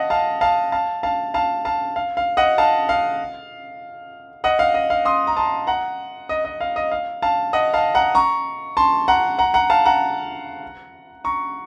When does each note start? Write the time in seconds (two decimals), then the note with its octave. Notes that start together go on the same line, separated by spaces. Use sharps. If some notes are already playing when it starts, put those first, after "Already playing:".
Already playing: D#5 F5 F#5 A5
0.10 F5 A5
0.41 F5 A5
0.72 F5 A5
1.03 F5 A5
1.34 F5 A5
1.65 F5 A5
1.96 F5
2.17 F5
2.37 D#5 F#5
2.58 F5 A5
2.89 F5
4.44 D#5 F#5
4.59 F5
4.74 D#5
4.90 F5
5.05 C6 D#6
5.27 A#5
5.37 A5 C6
5.67 F#5 A#5
6.29 D#5
6.45 D#5
6.61 F5
6.76 D#5
6.91 F5
7.22 F5 A5
7.53 D#5 F#5
7.74 F5 A5
7.95 F#5 A#5
8.15 A#5 C#6
8.77 A5 C6
9.08 F#5 A#5
9.39 F#5 A#5
9.54 F#5 A#5
9.70 F5 A5
9.85 F#5 A#5
11.24 A#5 C#6